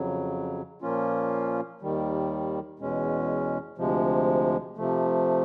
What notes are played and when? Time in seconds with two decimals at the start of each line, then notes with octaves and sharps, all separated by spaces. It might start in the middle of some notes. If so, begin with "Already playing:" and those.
Already playing: F2 C#3 F#3
0.82 A#2 F3 A#3 C#4 F4
1.81 D#2 D#3 G3
2.79 E2 B2 G#3 C#4
3.78 D2 C3 F3 G#3
4.77 C3 F3 A3